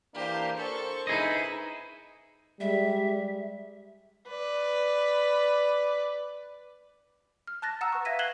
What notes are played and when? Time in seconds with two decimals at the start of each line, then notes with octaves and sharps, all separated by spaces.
0.14 E3 A#3 D4 G4 C5
0.57 D4 A4 A#4 C5 C#6
1.07 D#4 E4 G#4 B4 D#5
2.60 G3 G#3 E5
4.28 B4 D5
7.47 F6
7.62 A5 F#6 A6 A#6
7.81 F#5 A#5 D#6 E6 E7
7.93 B4 C#6
8.05 E5 F5 G#6 A#6 B6 D#7
8.19 F#6 G#6 C7 E7 F#7 G7